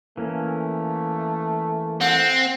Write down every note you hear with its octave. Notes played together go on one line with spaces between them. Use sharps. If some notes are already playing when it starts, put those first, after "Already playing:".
E3 A3 A#3 C#4
C4 F#5